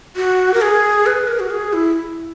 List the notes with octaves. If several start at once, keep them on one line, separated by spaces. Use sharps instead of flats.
F#4
A#4
G#4
B4
A#4
F#4
G#4
E4